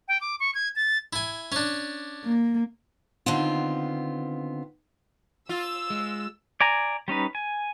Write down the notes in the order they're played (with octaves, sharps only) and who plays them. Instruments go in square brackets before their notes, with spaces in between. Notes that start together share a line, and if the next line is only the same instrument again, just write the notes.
[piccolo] G5
D6
C#6
G#6
A6
[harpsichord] E4 G#5
C#4 D4
[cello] A#3
[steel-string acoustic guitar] D3 D#3 B3 C4 F4
[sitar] F4 [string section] E6
[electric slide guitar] G#3
[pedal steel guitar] D5 G#5 A#5
G3 C#4 D#4 B4
G#5